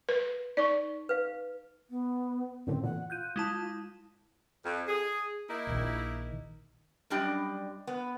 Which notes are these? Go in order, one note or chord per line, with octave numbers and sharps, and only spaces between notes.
B4
D#4 D5 C#6
B4 F5
B3
F#2 A2 D3 C4
A#2 E3 F#5
F4 F#6 G6 D#7
G#3 E4 A5
F2
G#4
A#3 D#4 E4
A#1 D#3
F#2 G3 D4 G4 D#5
B3